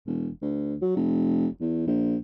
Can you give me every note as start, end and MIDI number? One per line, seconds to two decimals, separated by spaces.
0.07 0.30 28
0.42 0.76 38
0.82 0.95 54
0.96 1.47 29
1.60 1.86 40
1.87 2.16 34